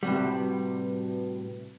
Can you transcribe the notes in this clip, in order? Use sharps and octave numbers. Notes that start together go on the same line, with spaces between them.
A2 C3 G3 F#4 B4